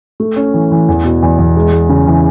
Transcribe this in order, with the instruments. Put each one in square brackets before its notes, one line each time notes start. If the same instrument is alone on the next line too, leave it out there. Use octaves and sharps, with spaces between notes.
[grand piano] A3
C#4
E3
E3
E2
B2
E2
E2
G#3
G#3
C#3
E3